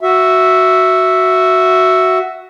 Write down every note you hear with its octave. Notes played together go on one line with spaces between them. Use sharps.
F#4 E5